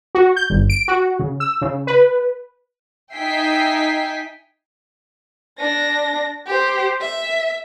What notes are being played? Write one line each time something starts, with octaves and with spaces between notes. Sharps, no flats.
F#4
G6
G1
D7
F#4
C#3
E6
C#3
B4
D#4 E5 G5 G#5 B6 C7
D4 A#6
G4 C5
E5